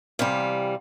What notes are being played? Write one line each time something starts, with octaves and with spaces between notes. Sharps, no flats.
C3 E3 G3 F5